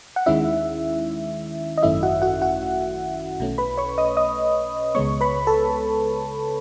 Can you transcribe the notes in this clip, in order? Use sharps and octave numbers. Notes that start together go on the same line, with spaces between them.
F#5
D#2 D#3 G#3 C#4 E4 E5
D#5
G#1 F#2 D#3 A3 C#4 E4 E5
F#4 F#5
F#4 F#5
F#4 F#5
B1 B2 A3 C#4
B4 B5
C#5 C#6
D#5 D#6
D#5 D#6
C#2 C#3 G#3 B3 C#5 C#6
B4 B5
A4 A5